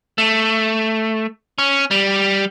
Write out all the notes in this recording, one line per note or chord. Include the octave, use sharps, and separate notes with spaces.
A3
C#4
G3